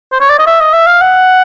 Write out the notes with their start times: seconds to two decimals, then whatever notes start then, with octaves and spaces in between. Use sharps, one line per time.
0.12 C5
0.20 C#5
0.30 D5
0.39 D#5
0.47 E5
0.61 D#5
0.73 E5
0.87 F5
1.01 F#5